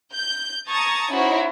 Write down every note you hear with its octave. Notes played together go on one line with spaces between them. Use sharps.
G6
A5 A#5 C#6 D#6 G#6 A6
C#4 D#4 E4 F#4 C5 C#5